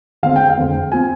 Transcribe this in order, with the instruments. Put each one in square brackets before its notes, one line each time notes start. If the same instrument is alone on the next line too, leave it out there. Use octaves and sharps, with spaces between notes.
[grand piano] D3 G#3 C4 F5
G5
F5
F2 D3 G#3 C4
F3 C4 G#5